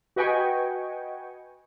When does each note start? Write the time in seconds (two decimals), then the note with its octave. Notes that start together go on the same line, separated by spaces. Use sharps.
0.16 F#4 B4 D#5 G5 G#5 C#6